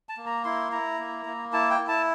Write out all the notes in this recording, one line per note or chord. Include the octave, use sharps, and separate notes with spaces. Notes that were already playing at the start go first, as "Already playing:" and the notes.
A5
A#3
A#5
E4 C6
E4 A#5
A#3
A#3
E4 A5
G5
E4
A5